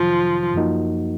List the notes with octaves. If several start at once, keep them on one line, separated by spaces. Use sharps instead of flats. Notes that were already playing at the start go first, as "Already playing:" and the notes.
Already playing: F2 C3 D#3 F3 F#3
F#2 F3 A#3 D#4 F#4